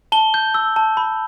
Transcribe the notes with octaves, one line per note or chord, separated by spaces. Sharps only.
A5 G7
G6
E6
A5
B5